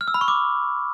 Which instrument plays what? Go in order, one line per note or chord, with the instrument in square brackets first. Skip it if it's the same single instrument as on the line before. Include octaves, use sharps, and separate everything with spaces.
[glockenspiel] F6
E6
B5
C#6
D6